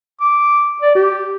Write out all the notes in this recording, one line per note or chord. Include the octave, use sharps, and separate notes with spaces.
D6
D5
G4